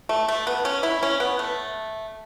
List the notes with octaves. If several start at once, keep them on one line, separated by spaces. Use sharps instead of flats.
A3
A3
B3
C#4
E4
C#4
B3
A3